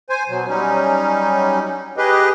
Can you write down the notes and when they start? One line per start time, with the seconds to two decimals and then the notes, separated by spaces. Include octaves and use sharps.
0.10 C5 G#5
0.29 B2 F#3
0.48 F#3 G3 C#4 D#4
1.97 G4 G#4 B4 D#5